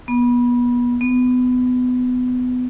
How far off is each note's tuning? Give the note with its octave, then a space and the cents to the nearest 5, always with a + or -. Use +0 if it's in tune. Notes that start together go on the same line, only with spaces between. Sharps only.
B3 -25
B3 +25